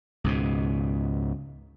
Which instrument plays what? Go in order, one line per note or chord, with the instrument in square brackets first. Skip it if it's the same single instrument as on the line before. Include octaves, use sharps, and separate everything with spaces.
[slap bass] C#2 G#2 B2